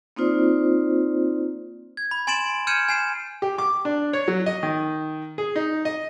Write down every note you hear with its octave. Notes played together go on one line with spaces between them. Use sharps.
A#3 C4 D#4 F4 C5 D5
G#6
B5
G#5 C6 A6 D7 E7 F#7
F6 G6 G#6 C#7 D#7 E7
G#5 C7 E7
G4
D6
D4
C#5
F#3
D#5
D#3
G#4
D#4
D#5